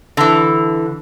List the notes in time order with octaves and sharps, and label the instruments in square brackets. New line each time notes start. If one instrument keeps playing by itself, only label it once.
[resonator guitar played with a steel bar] D3 E3